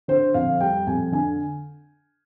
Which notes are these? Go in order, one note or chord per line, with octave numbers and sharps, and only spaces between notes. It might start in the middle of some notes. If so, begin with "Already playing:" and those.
D3 C5
F2 F5
G3 G5
F2 G#5
D3 G#5